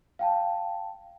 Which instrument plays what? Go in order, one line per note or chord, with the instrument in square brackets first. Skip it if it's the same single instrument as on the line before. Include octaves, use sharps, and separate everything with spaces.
[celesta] F5 G5 A5